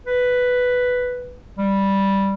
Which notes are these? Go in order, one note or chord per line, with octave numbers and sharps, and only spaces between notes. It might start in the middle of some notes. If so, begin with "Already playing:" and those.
B4
G3